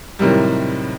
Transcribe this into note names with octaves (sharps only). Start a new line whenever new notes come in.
A2 C3 D#3 F#3 G3